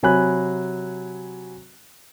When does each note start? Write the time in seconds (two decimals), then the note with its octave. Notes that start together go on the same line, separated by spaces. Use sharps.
0.03 C3 F#3 G#5 B5 F#6